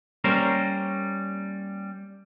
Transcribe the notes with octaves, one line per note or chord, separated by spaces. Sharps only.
G3 A#3 C#4 A#4 C5